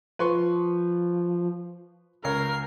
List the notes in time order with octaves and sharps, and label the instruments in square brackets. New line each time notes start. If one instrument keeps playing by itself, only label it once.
[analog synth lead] F3 [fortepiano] B4 C6 C#6
[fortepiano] C#2 C#5 [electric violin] A#4 [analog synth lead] C7